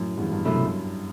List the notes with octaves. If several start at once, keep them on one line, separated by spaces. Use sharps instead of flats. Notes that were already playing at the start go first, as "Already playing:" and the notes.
Already playing: F#2 A2
E2 G2
E2 G2
C2 F#2 B2 A3 E4